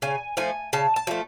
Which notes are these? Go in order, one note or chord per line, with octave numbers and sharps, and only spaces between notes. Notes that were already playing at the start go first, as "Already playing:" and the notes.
C#3 G#5
F3 A3 G#5
C#3 A5
A5
F3 A3